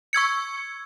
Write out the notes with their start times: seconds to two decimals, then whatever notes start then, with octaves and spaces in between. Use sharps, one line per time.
0.13 C#6 E6 G#6 C#7